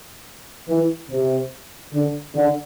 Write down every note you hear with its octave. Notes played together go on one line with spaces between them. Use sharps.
E3
C3
D3
D3